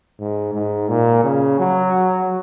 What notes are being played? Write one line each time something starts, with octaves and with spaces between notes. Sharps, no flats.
G#2
G#2
A#2
C#3
F#3